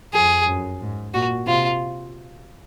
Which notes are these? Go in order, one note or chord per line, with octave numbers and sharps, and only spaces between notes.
F2 G#4
F#2
G#2
A#2 F#4
C3 F4